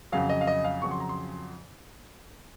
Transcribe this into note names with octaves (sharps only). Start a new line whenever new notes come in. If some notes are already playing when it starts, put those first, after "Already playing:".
F2 C#3 F#3 F5
D#5
F5
D#5
F5
F2 C#3 F#3 C#6
C6
A#5
C6